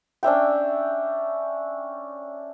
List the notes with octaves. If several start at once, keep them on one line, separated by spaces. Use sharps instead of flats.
C#4 D4 E5 G5